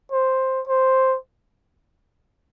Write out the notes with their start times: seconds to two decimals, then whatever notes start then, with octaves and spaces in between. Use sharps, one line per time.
0.12 C5
0.67 C5